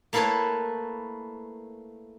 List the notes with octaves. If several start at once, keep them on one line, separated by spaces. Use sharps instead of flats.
A3 A#3 E4 A4 B4 C#5